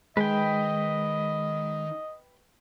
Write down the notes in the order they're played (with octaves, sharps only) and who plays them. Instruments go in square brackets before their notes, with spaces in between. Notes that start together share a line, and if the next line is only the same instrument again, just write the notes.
[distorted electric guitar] D#3 A#4 [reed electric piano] G#3 [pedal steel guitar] B4 G5 [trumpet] D#5